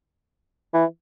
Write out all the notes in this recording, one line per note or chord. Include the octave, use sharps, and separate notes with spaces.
E3